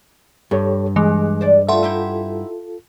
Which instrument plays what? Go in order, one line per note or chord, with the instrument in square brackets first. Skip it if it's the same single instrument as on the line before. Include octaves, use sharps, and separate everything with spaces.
[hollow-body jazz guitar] G2 [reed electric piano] G4 A4 C#5
[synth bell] E3 G#3 [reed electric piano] G#4 D#5
[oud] C5 D5
[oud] G3 A3 B3 [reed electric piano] F4 A4 [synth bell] E5 F#5 C6
[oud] D#4 E4 G4